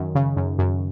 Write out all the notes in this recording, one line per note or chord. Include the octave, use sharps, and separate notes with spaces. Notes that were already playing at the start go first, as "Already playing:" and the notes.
Already playing: F#2 D#3
C#3
F#2
F#2